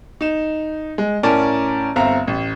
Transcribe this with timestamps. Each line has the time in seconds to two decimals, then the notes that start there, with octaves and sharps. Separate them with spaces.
0.21 D#4 E7
0.98 G#3
1.23 A2 C#4 A#4 D5 A5 A#5
1.96 G1 C4 E5 F5 A#5
2.27 A1